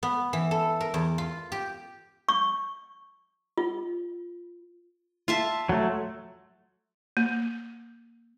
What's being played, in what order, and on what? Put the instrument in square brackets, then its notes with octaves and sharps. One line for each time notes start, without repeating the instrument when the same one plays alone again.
[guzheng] B3
E3
A4
A#4
E2
F4
G4
[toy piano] C#6
F4
[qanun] F4 E5 A5
[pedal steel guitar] F#3 A3
[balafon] A#3